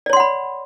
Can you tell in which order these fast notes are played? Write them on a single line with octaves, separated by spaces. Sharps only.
D5 C#5 C6 F#5 B5